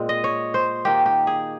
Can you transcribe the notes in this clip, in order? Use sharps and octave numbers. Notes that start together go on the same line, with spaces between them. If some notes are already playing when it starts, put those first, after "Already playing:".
Already playing: A#2 G#3 C4
D#5
C#5
C5
D#3 A#3 D#4 G4
G4
G#4